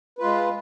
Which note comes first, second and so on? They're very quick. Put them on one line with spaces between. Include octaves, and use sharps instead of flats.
B4 F4 G#3